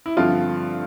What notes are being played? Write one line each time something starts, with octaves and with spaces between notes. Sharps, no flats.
E4
G2 D3 F3 A3 C4 F4